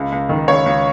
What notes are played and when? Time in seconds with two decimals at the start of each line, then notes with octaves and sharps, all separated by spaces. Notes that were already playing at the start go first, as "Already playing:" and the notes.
Already playing: C#2
0.12 C#2
0.29 D#3
0.48 C#2 C#5
0.66 C#2